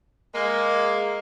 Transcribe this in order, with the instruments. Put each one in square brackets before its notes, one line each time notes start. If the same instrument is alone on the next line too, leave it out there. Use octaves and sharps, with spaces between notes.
[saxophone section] G#3 A#3